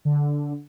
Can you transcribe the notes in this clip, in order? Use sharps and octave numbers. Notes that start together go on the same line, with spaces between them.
D3